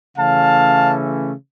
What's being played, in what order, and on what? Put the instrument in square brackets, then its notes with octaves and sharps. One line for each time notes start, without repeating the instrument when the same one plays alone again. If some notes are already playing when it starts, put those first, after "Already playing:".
[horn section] C#3 E3 A3 C#4 F5 A5